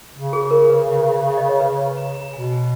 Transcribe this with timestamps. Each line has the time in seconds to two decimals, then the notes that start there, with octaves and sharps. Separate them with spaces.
0.15 C#3
0.33 G#4
0.51 A#4
0.69 B4
1.38 D#5
1.49 C#5
1.60 B4
1.78 C#5
1.97 A#5
2.15 A#5
2.33 B2 G#5
2.52 G#5